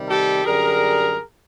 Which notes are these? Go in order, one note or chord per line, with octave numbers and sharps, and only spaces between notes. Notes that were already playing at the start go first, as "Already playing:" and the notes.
Already playing: C3 D#3 G3
G4 A4
F#2 D3 G3 G#4 A#4